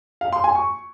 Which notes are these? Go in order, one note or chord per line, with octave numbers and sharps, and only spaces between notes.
F5
C6
G#5
C#6